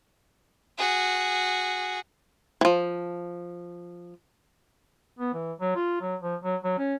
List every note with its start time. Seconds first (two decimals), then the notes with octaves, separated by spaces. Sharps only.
0.78 F#4 G#4
2.61 E3 F3
5.19 B3
5.34 E3
5.60 F#3
5.76 F4
6.01 F#3
6.22 F3
6.44 F#3
6.64 F#3
6.78 C#4